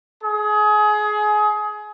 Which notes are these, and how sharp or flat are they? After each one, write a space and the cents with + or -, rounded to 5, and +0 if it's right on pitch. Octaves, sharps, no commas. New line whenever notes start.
G#4 +25